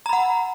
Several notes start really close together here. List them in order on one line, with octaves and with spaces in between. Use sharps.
A#5 B5 F#5